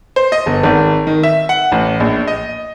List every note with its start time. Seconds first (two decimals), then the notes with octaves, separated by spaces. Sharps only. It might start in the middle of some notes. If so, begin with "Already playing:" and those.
0.16 C5
0.32 D#5
0.46 G1
0.63 G#1
1.07 D#3
1.23 E5
1.49 F#5
1.72 A1
2.00 A#1
2.27 D#5